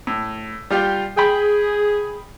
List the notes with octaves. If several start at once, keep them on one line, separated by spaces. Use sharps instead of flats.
A2
G3 F4 G4
G#4 G5 B5